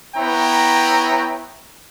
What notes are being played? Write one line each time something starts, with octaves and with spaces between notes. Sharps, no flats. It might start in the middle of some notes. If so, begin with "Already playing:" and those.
B3 E4 C#5 G5 A#5